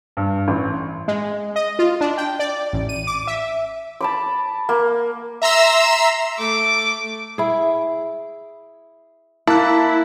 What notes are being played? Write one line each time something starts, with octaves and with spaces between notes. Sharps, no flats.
G2
A1
G#3
D#5
F4
D4
G5
D5
A1
D#7
D6
E5
A5 B5 D6
A#3
E5 A#5 C6 E6
A3 D6
E4 G#4
A#3 E4 A5 F#6